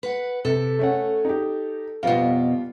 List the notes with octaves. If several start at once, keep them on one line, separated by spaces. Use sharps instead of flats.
B4 F#5
C3 A4
A3 C#4 F#5
D#4 G4
F2 B2 G3 B3 F4